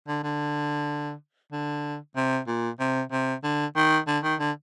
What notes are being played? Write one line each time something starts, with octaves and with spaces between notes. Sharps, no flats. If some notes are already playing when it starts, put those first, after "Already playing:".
D3
D3
D3
C3
A#2
C3
C3
D3
D#3
D3
D#3
D3